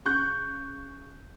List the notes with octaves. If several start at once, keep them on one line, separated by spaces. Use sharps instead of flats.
C#3 C#6 F#6 G6